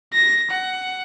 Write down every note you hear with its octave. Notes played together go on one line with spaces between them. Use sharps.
A#6
F#5